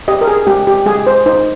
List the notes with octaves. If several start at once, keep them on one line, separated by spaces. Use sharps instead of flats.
G4 D#5
A#4
G#4
G#3 G4
G4
G#3 G#4
C5
D#4 C5